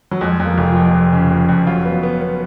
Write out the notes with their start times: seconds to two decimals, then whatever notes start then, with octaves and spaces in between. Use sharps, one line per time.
0.11 F#3
0.21 F2 G#3
0.40 F2
0.45 A#3
0.58 F1
0.70 F3
0.76 F2
0.94 F2
1.12 C#3
1.31 F2
1.49 F2
1.67 F#3 F4
1.85 B3
1.91 F#3
2.03 B3
2.22 B3